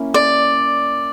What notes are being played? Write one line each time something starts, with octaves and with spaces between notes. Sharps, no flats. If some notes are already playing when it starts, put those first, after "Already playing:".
Already playing: A#3 C#4 E4
D5